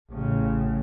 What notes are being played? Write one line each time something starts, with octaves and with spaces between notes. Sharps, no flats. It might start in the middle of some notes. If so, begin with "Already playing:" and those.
A1 C#3